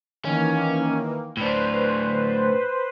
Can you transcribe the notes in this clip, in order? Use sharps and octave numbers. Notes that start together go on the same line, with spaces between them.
D#3 E3 A#3 C#4
A2 D4 B4 C5